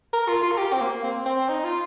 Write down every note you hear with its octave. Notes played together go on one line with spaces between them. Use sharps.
A#4
F4
F4
A#4
G4
C4
A#3
C4
C4
D#4
F4